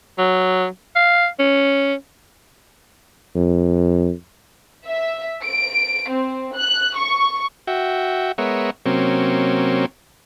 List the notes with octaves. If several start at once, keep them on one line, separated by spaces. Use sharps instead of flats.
F#3
F5
C#4
F2
E5
D7
C4
F#6
C#6
F#4 E5 G5
G#3 B3 A#4 C#5 E5 F#5
C3 F#3 A#3 C4 C#4